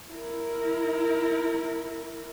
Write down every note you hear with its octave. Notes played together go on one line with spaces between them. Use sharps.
E4 A#4